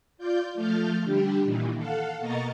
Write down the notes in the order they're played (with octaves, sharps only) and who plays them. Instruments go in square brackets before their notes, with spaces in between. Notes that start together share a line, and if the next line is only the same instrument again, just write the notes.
[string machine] F4 D5 G6
F3 A3 F6 G6 A6
D3 G3 D4 G4
A#2 D#3 E3
A4 F5 F#5
B2 A#3 D#5 A#5 C#6 A6